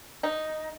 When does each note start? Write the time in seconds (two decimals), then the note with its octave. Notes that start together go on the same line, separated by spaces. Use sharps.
0.23 D#4